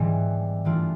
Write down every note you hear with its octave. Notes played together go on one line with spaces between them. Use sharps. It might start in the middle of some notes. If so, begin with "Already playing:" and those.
Already playing: G#2 E3 G3 B3
G2 E3 A3 D4 F4